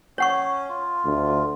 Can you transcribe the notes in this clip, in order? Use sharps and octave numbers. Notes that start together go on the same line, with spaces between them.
C#4 C#5 F#5 C#6
F4
D2